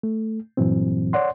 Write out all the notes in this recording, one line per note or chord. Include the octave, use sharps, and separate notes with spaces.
A3
G2 A#2 E3 F#3 C4
C#5 D5 F#5 C6